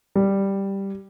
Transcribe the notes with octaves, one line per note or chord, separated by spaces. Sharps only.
G3